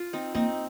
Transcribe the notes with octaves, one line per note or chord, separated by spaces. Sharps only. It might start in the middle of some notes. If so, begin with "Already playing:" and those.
Already playing: F4
C4 D#4
A#3 C4 D#4